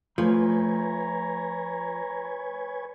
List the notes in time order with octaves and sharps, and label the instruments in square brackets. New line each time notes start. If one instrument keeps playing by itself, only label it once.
[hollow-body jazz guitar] F3 [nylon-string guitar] A3 [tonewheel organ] B4 C#5 G#5 [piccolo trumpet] A#5